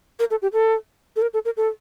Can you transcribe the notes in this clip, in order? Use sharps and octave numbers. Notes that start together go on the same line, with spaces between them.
A#4
A4
G4
A4
A4
A#4
A4
A#4
A4